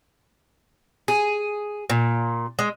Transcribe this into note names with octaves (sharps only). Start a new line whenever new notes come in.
G#4
A#2
G#3